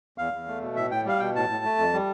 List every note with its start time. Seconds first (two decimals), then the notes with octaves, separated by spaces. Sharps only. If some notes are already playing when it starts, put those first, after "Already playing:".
0.18 E2 F5
0.33 E2
0.47 A3
0.62 B2
0.76 A2 E5
0.91 A2 G5
1.06 G3 F5
1.20 B2 G5
1.36 A2 A5
1.50 A2
1.65 A3
1.78 F2
1.93 G3